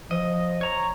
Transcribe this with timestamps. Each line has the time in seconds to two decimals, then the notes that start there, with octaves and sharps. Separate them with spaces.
0.11 F3 D#5
0.61 C#5 A#5